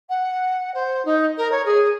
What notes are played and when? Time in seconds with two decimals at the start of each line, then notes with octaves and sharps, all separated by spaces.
0.09 F#5
0.74 C5
1.05 D#4
1.37 A#4
1.51 C#5
1.65 G#4